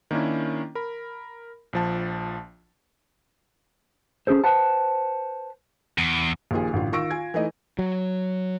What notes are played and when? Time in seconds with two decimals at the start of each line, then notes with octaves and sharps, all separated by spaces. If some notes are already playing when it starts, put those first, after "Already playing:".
0.11 D#3 A#3 C#4 D4 E4
0.75 A#4 B5
1.73 A#1 F3 A5
4.27 C#4 G#4 A4 C5
4.44 B4 C5 F#5 A5
5.98 E2
6.51 A#1 A#2 D#3 F4 G4 G#4
6.73 A1 D3 F4
6.92 D#3 F4 C#6 E6 A#6 D7
7.11 F4 G#5 G#6
7.34 E3 A3 D#4 D#5
7.79 F#3